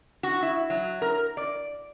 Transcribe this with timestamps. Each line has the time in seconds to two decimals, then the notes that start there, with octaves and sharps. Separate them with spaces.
0.23 F#4
0.43 E4
0.70 F#3
1.02 A#4
1.37 D5